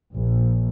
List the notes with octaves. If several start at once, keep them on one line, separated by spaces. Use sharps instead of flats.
A#1